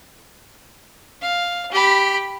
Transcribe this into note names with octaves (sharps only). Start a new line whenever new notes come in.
F5
G4 B5